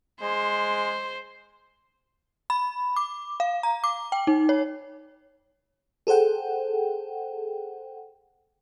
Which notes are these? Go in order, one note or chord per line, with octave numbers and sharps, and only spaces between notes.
G#3 C5
B5
D6
F5
A#5
D6
G5
D#4
C#5
G#4 A4 C5 F#5 G5